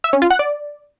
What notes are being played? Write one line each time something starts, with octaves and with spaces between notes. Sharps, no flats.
E5
C#4
F4
F#5
D5